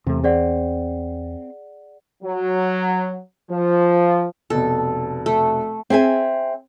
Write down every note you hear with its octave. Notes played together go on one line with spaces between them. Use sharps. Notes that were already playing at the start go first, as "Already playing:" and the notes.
E2 C3 A3
C4 G#4 D5 F#5
F#3
F3
F1 B2 A4
A3
C4 G#4 E5 G#5